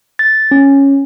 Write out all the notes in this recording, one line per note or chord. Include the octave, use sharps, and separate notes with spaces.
A6
C#4